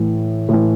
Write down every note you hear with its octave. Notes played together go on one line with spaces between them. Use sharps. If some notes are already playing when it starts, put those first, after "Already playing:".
Already playing: A2 E3
A2 E3